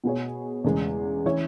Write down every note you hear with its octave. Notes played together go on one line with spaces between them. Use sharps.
B2 B3 G#4 C#5
E2 C#3 G#3
E3 C#4 E4 C#5